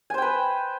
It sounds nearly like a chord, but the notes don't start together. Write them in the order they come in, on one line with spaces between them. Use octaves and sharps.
G#5 C5 G5 B4